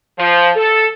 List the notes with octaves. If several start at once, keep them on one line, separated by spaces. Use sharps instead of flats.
F3
A4